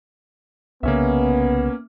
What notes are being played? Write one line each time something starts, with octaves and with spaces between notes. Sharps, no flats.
C2 C#3 A#3 B3 C#4 E5